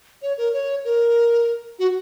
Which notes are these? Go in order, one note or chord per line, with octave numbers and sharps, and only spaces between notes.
C#5
A#4
C#5
A#4
F#4